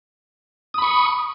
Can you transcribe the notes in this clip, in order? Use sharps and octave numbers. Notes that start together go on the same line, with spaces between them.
B5 C#6 D#6